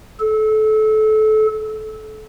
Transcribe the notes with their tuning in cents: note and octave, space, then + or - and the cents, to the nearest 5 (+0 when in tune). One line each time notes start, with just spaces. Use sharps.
A4 -25